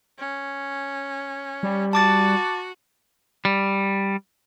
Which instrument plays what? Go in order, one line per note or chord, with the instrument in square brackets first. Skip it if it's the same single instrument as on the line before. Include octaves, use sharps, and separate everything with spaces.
[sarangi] C#4
[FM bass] G3
[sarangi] F#4 [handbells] A5 D6 A6
[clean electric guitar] G3